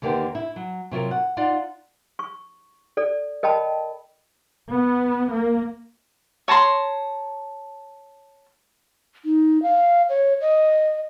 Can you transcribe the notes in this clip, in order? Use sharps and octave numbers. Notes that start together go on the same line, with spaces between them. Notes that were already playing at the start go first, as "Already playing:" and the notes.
D#2 D3 A#3 B3 G4 C5
E4
F#3
C3 F#3 F4 A#4
F#5
D#4 F4 D5 F5 F#5
C#6
A4 D5
A#4 D#5 G5 A5 B5
B3
A#3
C#5 A5 A#5 C6
D#4
F5
C#5
D#5